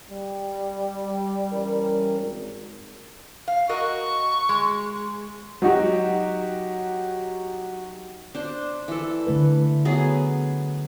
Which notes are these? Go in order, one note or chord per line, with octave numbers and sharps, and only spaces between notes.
G3
E3 C#4 A#4
G#1
F5
F#4 A#4 D#5 C#6
G#3
F#3 D#4 F#4 G4
D4 C5
E3 A4
D3 A3 B4
F#3 B3 G#4